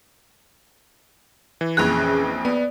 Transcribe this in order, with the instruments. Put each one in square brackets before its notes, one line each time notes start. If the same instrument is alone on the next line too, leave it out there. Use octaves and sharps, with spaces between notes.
[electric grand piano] E3
[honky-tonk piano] A#1 F2 F#6 [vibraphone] C#4 G#4
[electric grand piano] B3 [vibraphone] D5